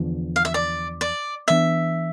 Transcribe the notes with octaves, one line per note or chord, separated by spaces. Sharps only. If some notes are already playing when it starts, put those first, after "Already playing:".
Already playing: E2 D3 F3
F5
E5
D5
D5
E3 B3 D4 E5